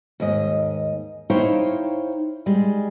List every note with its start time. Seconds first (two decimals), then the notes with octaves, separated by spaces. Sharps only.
0.20 D#2 G#2 D#5
1.30 D#4 E4 C5 C#5 F5 G5
2.46 G3 G#3